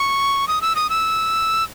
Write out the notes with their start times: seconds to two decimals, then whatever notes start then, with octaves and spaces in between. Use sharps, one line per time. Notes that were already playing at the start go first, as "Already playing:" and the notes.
Already playing: C#6
0.48 D#6
0.62 E6
0.76 D#6
0.90 E6